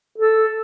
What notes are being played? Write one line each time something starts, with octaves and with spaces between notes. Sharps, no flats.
A4